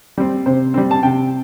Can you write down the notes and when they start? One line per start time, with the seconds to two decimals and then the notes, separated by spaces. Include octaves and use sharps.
0.18 G3 C4
0.46 C3 C5
0.74 G3 C4
0.91 A5
1.03 C3 G5